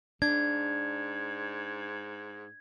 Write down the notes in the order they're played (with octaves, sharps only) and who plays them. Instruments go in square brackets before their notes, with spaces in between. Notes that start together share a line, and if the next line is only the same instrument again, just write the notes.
[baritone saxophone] G#2 [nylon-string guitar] D4 [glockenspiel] G#6